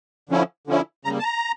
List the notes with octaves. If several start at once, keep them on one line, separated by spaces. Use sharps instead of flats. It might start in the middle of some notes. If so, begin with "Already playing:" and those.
D3 F3 C#4 E4
D3 F3 C#4 E4
C#3 G3 A#3 A#5
A5
A#5